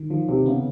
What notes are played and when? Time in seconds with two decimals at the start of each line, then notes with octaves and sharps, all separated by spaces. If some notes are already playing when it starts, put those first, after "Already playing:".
Already playing: D#3
0.10 D#3 F3
0.29 C3 D#3
0.46 C#3 B3